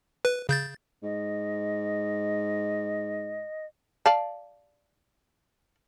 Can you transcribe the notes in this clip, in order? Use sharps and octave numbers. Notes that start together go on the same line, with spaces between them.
B4
C#3 G6 A6
G#2 D#5
D5 F5 A5